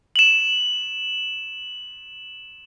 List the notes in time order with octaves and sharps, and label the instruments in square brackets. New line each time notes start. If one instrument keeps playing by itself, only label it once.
[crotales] E7 F#7